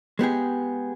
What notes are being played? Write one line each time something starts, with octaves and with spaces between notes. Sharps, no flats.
G#3 B3 G4 G#4